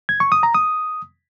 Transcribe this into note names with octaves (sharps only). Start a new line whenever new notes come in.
G#6
C#6
D#6
A#5
D#6